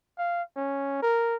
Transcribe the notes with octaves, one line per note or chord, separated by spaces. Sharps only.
F5
C#4
A#4